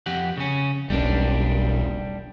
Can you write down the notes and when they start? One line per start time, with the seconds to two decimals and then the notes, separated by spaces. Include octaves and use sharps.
0.06 F2 G4 F#5
0.37 C#3 C#4
0.90 E1 B1 G3 C#4 D4